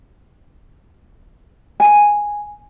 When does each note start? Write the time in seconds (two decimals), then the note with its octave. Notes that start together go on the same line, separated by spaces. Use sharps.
1.80 G#5